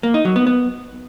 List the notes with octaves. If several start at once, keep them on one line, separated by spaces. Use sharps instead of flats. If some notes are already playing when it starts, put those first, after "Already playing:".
A#3
D#4
F#3
B3
B3